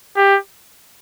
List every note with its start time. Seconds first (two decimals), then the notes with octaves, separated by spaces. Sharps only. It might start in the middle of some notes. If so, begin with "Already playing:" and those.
0.17 G4